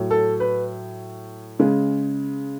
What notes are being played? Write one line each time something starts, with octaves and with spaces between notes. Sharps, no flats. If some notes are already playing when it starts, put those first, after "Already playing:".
Already playing: A2 F#3
A4
B4
C#3 G#3